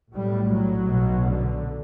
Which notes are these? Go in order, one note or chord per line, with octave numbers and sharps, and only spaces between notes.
B1 A2 G3
F#3
B1 B2
D3